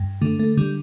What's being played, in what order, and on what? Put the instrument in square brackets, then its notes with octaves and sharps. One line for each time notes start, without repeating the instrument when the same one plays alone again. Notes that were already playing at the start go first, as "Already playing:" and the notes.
Already playing: [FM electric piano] G2
D3 A3
A3
D3 G3